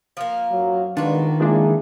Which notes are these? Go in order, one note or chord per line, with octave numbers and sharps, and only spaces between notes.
F3 A#3
F#2 F#3
C2 D#3 G#3 B3 D4 F4 F#4
F3 G#3 A#3 D4 E4 G#4